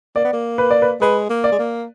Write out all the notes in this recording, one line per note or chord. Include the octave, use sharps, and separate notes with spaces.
A#3 D5
B3
A#3
B4
D5
B4
G#3 B4
A#3
D5
G#3
A#3